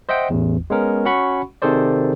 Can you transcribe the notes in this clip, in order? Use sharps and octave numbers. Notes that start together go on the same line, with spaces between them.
C5 D#5 E5 F#5 G5
A1 E2
G#3 B3 C#4 A#4
C#4 F#4 F#5 B5 C#6
C3 D#3 G#4 A4 C5 D5